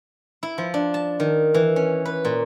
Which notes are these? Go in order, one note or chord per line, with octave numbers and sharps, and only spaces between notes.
E4
F3
D4
A5
D#3
E3
C#4
B4
A#2